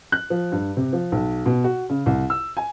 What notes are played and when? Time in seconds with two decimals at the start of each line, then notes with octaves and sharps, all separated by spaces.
0.12 F#6
0.30 F3
0.52 G2
0.77 C3
0.93 F3
1.12 B1
1.46 B2
1.64 F#4
1.90 C#3
2.06 C2
2.30 E6
2.57 G#5